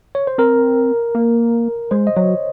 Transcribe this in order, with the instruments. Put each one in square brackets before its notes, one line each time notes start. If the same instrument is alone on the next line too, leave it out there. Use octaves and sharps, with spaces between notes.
[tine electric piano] C#5
C5
[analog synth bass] C4 [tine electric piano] A#4
[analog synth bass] A#3
[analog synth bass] G#3 [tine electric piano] C5
[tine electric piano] D#5
[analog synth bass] F#3 [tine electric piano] C#5